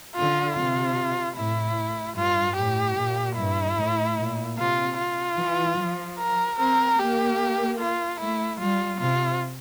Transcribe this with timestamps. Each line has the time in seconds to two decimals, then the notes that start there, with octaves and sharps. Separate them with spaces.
0.15 D3 F4
0.56 C3 F4
1.36 A2 E4
2.16 G2 F4
2.56 A2 G4
2.97 A#2
3.37 G2 E4
3.77 A2
4.18 A#2
4.58 C3 F4
4.98 F4
5.38 E3
5.78 F3
6.19 A#4
6.59 C4 A#4
6.99 A#3 G4
7.79 F4
8.20 A3 E4
8.60 G3 F4
9.00 C3 F4